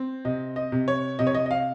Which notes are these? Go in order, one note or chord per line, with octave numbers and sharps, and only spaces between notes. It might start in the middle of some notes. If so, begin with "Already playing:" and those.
Already playing: C4
C3 D#5
D#5
C3
C#5
C3 D#5
C#5
D#5
D#5
F5